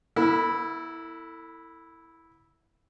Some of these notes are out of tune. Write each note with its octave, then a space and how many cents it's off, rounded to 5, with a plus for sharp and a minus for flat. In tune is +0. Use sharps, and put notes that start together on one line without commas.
B3 -35 E4 -5 A4 +35